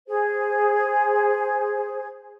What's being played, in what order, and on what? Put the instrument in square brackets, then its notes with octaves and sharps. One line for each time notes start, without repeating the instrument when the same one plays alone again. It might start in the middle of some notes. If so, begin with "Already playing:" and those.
[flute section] G#4 C5